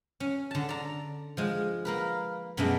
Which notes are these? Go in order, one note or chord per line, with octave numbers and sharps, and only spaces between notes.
C#4
D3 A5
D5 A#5
F3 G#3
A#3 A#4 B4
F#2 B2 G#3 A3 B3 D4